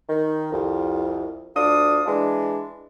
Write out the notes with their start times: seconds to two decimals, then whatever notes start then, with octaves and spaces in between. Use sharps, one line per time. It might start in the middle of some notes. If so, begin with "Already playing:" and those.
0.09 D#3
0.52 C2 F2
1.56 D2 D4 F4 D#6
2.06 E3 G#3 D4